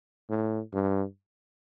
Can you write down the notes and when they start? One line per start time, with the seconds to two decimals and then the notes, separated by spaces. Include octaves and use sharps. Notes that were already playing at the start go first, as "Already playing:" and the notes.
0.30 A2
0.73 G2